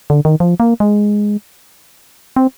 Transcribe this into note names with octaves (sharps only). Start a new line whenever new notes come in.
D3
D#3
F3
A#3
G#3
C4